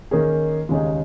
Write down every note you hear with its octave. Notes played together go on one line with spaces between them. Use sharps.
D#3 A#3 C#4 G#4
D#2 C#3 G#3 D#4 G#4